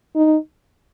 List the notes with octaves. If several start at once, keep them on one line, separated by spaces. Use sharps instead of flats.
D#4